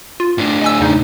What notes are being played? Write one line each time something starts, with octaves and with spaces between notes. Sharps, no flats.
F4
A2 D4
D#5 G#5 E6
E2 C#3 D#4